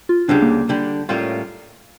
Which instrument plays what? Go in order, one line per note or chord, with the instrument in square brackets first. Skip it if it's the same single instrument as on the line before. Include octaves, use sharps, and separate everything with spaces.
[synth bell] F4
[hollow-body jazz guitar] D2 C#3 G3 [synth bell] D4
[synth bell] A#3
[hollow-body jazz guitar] D3 G3 D4
A2 G3 A#3 C#4 F4